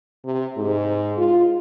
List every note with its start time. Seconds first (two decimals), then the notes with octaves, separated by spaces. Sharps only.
0.24 C3
0.56 G#2
1.17 F4